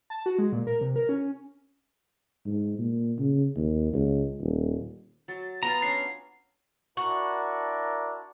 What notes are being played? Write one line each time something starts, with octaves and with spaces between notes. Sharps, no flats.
A5
F#4
G#3
A#2
A#4
C3
A#4
C#4
G#2
A#2
C#3
D#2
C#2
D#1
F#3 A6
B3 F4 A#5
C#4 D4 C#5 C7
D4 E4 F#4 A#4